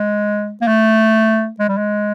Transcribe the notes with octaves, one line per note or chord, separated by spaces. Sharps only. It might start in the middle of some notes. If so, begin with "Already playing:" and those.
Already playing: G#3
A#3
A3
G#3
G3
G#3